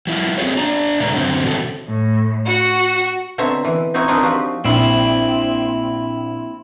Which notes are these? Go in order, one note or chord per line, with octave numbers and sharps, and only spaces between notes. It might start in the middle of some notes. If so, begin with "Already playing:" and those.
F#3 E4 F4
C4 F4 F#4 G#4 C5 C#5
D4 D5 A#5
A#2 C#3 G#3 A3 B4 A#5
F#2 D3 F#3 C4 C5
B2 D#3 C4 F#4 A4
A2
F#4
B2 D3 C4 C#5 E5 A#5
E3
C4 D#4 E4 F#4 C#5
C4 D4 D#4 G#4 A#4 B4
F3 C4 F#4 G4
A#1 C4 E4